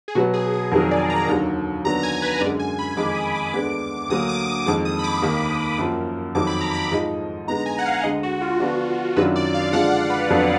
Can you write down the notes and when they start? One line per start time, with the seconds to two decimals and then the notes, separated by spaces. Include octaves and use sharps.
0.08 G#4
0.15 B2 F#3 B3 F#4
0.34 G#4
0.53 G#4
0.71 F2 D#3 F#3 A#4
0.91 D5
1.10 A#5
1.28 D#2 D3 F#3
1.84 D#2 D3 F#3 B3 D4 A#5
2.03 G#5
2.22 B4
2.40 F#2 D3 G#3 D5
2.59 G#5
2.79 B5
2.97 F2 D#3 G#3 D#4 D6
3.16 D#6
3.35 D6
3.53 D2 D3 G#3 B3 D4 D6
4.09 D2 D3 F#3 A#3 D#6
4.29 D6
4.47 D6
4.66 F2 D#3 G#3 D6
4.85 D#6
4.99 B5
5.04 D6
5.22 D#2 D#3 A#3
5.79 F#2 F3 A#3
6.35 F2 D#3 F#3 D6
6.47 B5
6.61 A#5
6.73 B5
6.91 G#2 F3 G#3 D#4
7.48 D3 G#3 B3 D#4 A#5
7.66 G#5
7.79 F#5
7.86 F5
8.03 D2 D3 G#3 D#5
8.23 F#4
8.41 F4
8.60 D3 F3 B3 D4 F#4
9.16 F#2 D#3 F#3 D4 F4 B4
9.36 D5
9.54 F5
9.72 D3 F3 G#3 D4 F4 F#5
9.92 F5
10.10 B4
10.29 F2 D3 F#3 B3